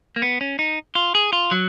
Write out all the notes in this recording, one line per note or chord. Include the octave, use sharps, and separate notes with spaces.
A#3
B3
C#4
D#4
F4
G#4
F4
F#3